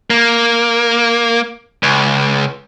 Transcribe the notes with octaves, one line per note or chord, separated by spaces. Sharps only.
A#3
C#2